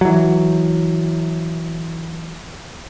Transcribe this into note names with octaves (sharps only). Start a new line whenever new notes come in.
E3 F#3